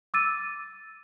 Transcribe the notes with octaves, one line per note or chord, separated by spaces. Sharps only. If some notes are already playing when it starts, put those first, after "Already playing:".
D6 E6 A6 D#7